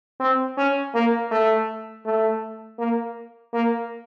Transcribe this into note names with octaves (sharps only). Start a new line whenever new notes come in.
C4
C#4
A#3
A3
A3
A#3
A#3